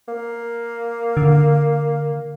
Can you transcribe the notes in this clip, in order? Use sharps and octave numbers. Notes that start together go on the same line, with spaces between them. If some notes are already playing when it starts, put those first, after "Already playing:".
A#3
D3